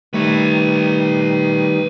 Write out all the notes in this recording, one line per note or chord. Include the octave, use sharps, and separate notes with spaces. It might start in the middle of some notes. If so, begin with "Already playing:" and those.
D#3 G3 A3 B4 C#5